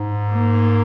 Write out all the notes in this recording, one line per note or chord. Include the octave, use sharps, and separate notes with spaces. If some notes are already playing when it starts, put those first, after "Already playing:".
Already playing: G#2
A#3